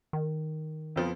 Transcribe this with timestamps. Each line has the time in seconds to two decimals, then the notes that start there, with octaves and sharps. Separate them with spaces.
0.13 D#3
0.96 F2 F3 B3